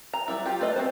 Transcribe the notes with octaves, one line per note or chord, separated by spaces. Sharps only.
A#5
F#3 G3 E4
F4 G4
A3 F4 B4 D#5
C4 F#4 C5